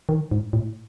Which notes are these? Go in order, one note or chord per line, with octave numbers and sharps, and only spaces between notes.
D#3
G#2
A2